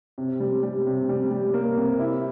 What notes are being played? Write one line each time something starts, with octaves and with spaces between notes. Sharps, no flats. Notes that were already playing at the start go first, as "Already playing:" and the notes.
C3
G3
G3
C3
G3
G3
A#3
C3
E4